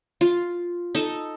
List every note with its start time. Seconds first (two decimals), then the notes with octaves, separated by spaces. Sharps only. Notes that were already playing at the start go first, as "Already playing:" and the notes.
0.21 F4
0.95 D#4 A4